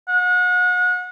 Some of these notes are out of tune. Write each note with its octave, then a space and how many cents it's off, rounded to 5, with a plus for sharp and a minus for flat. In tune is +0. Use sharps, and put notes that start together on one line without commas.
F#5 -35